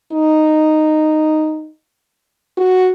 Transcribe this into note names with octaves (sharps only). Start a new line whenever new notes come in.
D#4
F#4